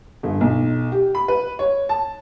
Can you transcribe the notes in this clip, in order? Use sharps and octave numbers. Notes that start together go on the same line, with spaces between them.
G1
B1
G4
B5
B4
C#5
A5